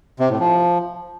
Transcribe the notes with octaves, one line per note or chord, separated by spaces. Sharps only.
C3
A2
F3